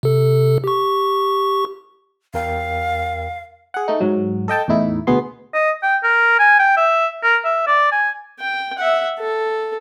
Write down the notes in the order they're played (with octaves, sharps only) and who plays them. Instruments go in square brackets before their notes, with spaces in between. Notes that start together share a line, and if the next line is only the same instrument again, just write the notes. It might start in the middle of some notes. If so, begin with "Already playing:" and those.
[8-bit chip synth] C3 A4
G4 C#6
[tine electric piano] E2 A#4 G5 [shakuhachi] F5
[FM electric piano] G#4 F#5
A3 D#4
G#2 F#3
A4 D#5 G5 A5
E2 A2 D#4 E4
D2 B2 B3 G#4 C6
[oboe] D#5
G5
A#4
G#5
G5
E5
A#4
E5
D5
G#5
[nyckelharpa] G5
E5 F#5
A4